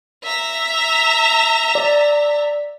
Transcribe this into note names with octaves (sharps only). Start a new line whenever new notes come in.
E5 A#5
D5